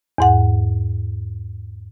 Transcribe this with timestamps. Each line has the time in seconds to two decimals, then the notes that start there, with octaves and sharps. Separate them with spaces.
0.18 E2 G#2 F#5